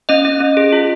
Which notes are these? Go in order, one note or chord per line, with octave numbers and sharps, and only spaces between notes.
C#4 D#5
C#4
C#4
G#4
F4